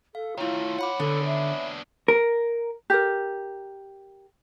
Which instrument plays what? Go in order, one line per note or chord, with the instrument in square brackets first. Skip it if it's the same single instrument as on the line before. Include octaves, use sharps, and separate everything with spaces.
[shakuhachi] A4 [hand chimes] F5
[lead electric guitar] D#3 A3 [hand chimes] E4 C#5 [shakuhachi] F4
[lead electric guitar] F#2 F#5 [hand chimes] C#5 B5 D6
[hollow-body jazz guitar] D3 [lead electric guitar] B3 D4 [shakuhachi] A4
[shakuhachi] E5
[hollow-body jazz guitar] A#4
[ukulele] G4 A#4